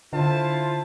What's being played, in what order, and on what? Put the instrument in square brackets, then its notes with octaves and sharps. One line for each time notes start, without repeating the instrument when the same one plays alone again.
[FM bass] D3 [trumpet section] E4 C5 A5 [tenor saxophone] F4